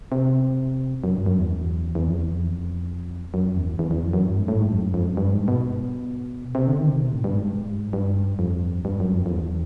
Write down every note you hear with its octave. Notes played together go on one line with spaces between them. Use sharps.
C3
F#2
G2
F#2
E2
E2
F2
E2
F2
F#2
E2
E2
E2
F2
F#2
G2
G#2
A2
G#2
F#2
F2
F#2
G2
G#2
B2
C3
D3
D#3
C3
B2
A2
G2
G#2
G2
F2
G2
F#2
F2
F2
E2